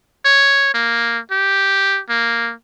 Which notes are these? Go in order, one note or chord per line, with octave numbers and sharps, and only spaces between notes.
C#5
A#3
G4
A#3